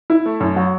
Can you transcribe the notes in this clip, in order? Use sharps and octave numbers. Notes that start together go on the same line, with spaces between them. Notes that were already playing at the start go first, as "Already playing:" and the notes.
E4
A3
F#2
F#3